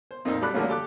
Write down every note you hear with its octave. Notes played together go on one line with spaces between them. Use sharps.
C5
F2 A#2 D#4 C5 E6
G3 A4 D5 B5 F#6
D3 F3 G3 A3 A#3 C#4
G4 A4 D6 F#6